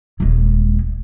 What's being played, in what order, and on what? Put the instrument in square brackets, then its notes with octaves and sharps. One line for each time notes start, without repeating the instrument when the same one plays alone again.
[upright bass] D#1 G#3